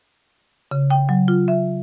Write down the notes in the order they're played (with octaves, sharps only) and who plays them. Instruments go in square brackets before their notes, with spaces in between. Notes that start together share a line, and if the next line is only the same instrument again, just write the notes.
[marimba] C#3
G5
F#3
F4
E5